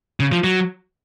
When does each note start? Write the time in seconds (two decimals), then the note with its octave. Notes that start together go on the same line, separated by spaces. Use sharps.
0.20 C#3
0.32 F3
0.44 F#3